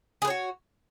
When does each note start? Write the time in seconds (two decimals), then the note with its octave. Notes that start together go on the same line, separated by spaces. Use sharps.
0.22 G#4
0.25 B4
0.27 C#5
0.30 F#4